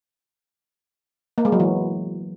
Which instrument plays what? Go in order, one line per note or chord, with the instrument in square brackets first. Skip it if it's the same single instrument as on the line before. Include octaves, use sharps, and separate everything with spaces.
[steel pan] A#3
G#3
F#3
E3